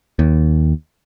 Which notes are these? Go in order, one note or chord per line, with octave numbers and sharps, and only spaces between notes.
D#2